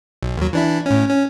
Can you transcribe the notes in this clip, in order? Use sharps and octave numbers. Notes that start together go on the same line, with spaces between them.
B1
D#2 F#3
E3 D4 E4
A2 C#4
C#4